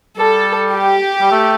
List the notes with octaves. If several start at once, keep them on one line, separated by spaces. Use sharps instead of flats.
G3 A4
G4
G3
A3